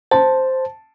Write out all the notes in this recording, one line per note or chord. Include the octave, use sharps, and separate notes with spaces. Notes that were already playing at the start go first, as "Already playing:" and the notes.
C5 A5